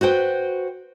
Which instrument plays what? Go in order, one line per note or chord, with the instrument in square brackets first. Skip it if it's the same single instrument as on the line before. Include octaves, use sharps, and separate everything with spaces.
[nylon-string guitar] F#4 B4 C5 G5